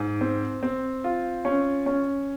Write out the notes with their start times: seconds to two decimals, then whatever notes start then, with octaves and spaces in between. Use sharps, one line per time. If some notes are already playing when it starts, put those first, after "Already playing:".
Already playing: G#2
0.21 C4
0.63 C4
1.04 F4
1.45 C#4
1.86 C#4